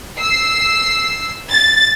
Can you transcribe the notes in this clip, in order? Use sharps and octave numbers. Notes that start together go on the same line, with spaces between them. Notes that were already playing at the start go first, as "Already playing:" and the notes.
E6 C7
A6